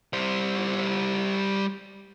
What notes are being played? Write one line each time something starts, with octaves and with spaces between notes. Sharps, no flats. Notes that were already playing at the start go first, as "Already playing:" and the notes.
G3 C5